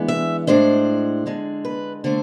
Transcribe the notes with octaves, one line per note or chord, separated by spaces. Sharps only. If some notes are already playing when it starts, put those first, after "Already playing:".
Already playing: E3 G#3 B3 D4
E5
A2 G#3 D4 C5
D3 G#3 D4
B4
D3 A3 C5